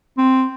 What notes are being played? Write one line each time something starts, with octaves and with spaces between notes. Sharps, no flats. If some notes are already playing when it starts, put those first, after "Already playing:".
C4